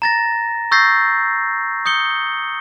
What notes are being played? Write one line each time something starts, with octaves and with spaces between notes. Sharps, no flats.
A#5 A6 A#6
C#6 E6 G6 A6 A#6 C7
D#6 G6 C#7 G7